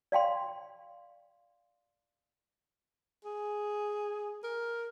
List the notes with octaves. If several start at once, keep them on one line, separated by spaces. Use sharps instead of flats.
D5 F5 G5 C6
G#4
A#4